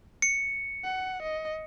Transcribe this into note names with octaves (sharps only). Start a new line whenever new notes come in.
C#7
F#5
D#5